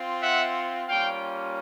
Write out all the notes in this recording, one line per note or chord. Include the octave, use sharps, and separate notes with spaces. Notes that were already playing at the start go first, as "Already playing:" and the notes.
Already playing: C4 F4
E5 F#5
G3 A#3 C#4 F4 F5 G5